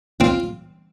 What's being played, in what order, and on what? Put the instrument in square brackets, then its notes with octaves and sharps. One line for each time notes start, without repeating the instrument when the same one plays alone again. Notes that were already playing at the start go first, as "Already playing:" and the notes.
[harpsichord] C4 [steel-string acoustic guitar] F4